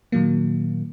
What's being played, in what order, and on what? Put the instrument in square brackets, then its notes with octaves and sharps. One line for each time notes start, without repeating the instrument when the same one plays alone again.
[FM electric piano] A#2 D#3 F#3 A#3